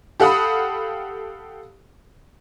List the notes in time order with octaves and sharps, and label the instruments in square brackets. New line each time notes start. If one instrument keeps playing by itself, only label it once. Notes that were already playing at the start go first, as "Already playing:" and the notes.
[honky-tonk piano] G4 A4 F5 F#5 B5 D#6